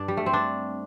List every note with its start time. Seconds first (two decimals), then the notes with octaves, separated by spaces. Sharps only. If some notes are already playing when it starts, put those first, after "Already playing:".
Already playing: G2 D4
0.08 G3
0.17 A3
0.26 C4
0.33 D4